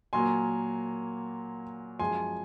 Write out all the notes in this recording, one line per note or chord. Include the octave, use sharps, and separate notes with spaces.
A#2 F#3 A#3 G#5 C6
F#2 F3 G#3 G#5 C6